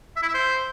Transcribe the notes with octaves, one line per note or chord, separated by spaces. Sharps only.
E5
E4
E5
C5